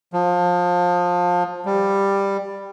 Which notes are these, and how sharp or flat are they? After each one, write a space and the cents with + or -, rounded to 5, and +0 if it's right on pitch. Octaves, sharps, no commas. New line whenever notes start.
F3 +25
G3 +10